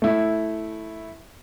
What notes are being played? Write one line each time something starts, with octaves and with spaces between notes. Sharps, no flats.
A3 E4